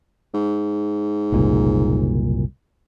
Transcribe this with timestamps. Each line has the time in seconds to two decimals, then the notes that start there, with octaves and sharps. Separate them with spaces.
0.34 G#2
1.32 F#1 C2 A#2